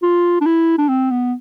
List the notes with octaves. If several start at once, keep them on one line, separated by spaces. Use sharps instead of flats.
F4
D4
E4
D4
C4
B3